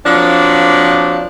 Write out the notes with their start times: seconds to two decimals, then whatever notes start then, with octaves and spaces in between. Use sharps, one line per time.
0.06 F3 F#3 A#3 C4 D4